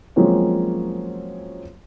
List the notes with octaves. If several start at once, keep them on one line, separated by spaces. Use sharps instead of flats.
F3 F#3 G#3 A#3 C4 C#4